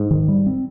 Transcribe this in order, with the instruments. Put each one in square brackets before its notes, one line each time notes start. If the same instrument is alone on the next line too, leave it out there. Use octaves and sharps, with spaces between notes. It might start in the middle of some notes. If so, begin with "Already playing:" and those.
Already playing: [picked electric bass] G#2
[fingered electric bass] D#3
G3
C4